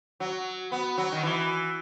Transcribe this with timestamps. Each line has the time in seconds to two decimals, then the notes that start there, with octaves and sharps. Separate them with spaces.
0.20 F#3
0.72 B3
0.98 F#3
1.12 D#3
1.23 E3